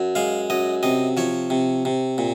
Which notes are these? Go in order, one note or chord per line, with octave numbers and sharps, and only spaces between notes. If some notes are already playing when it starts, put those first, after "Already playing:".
Already playing: F#2
G#3 F5
F#2 D#5
C3 D#5
F3 C#5
C3
C3
A#2